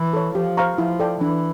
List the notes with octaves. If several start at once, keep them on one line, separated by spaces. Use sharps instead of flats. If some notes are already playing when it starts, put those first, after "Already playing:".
Already playing: E3
A4 C#5
F3 G4
C5 F5 A#5 C#6
F3 E4
A4 D5 G5
E3 D4